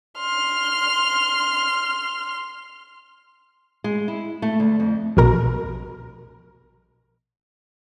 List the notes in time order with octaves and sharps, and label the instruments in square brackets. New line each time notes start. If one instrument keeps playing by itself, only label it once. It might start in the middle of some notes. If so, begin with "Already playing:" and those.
[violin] C6 F6
[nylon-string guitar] G#3
E4
A3
D2
F2
[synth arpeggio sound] A#1 B2 A#4 A#5